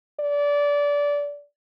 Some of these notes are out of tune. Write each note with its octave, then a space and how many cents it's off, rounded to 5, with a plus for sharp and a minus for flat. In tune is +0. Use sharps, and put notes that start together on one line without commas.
D5 -20